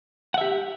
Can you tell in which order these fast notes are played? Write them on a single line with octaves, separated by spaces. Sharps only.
F#5 E5 G4